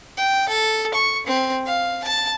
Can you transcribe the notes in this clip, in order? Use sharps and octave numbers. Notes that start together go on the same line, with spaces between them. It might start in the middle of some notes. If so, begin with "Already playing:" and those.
G5
A4
C#6
C4
F5
A5